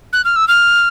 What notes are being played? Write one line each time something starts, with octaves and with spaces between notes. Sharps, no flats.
F#6
F6
E6
F6